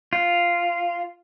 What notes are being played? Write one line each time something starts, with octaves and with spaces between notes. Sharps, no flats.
F4